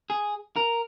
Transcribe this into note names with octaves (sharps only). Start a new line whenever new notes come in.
G#4
A#4